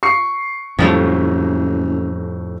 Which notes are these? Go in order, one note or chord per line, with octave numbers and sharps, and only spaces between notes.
C#6 C7 C#7
F#1 F2 A2 F3 G3 A3